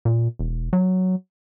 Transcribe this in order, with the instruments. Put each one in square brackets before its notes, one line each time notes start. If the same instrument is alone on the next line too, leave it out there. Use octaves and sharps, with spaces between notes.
[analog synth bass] A#2
E1
F#3